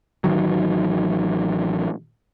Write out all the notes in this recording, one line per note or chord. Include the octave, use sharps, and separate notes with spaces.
A1 D#3 F#3